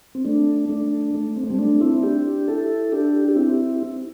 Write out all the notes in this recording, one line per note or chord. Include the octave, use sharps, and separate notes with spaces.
C4
A3 D4
A3 D4
A3
C4
A3
G3 C4
A3 D4
C4 E4
D4 G4
E4 A4
D4 G4
G4
C4 E4